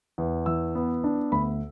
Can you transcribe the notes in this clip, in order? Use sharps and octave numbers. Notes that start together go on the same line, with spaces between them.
E2
E3 E6
B3
D4
D2 B5